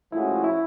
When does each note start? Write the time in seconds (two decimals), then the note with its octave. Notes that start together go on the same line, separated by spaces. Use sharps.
0.12 A2 F3 G#3 C#4 E4 F#4
0.44 E4